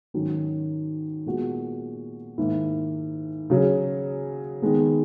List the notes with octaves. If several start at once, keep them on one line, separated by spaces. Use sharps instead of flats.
G#2 D#3 F#3 C#4
A#2 G#3 B3 F#4
G#2 D#3 A#3 E4
C#3 F#3 C#4 G#4
D#3 G#3 B3